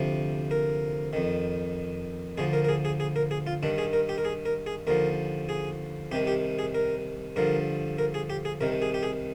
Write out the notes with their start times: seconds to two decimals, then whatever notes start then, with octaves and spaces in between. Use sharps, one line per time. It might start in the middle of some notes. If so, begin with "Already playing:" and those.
Already playing: D2 C3 F3
0.51 A#4
1.13 F2 D#3
2.38 D2 D3 F3 G#4
2.53 A#4
2.64 A#4
2.69 G#4
2.85 G#4
3.00 G#4
3.16 A#4
3.31 G#4
3.47 F4
3.63 G2 D#3 D4
3.78 G#4
3.93 A#4
4.09 G4
4.18 A#4
4.25 G#4
4.46 A#4
4.66 G#4
4.87 D#2 D3 F3 A#4
5.49 G#4
6.12 C2 C3 D#3 G4
6.27 G4
6.59 G#4
6.74 A#4
7.36 G2 D3 F3 A#4
7.98 A#4
8.14 G#4
8.30 G4
8.45 G#4
8.61 C2 C3 D#3 A#4
8.82 G#4
8.94 G4
9.03 G#4